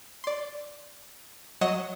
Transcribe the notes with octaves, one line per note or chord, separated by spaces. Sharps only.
D5 C6
F#3 C#5 D#5 F#5 A#6 E7